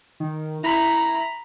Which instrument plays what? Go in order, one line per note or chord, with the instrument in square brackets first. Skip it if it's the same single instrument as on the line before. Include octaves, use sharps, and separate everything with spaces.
[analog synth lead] D#3
[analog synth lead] E4 [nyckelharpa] A#5 B5